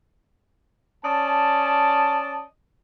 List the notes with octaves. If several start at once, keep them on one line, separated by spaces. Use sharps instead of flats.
C#4 D5 D#5 A5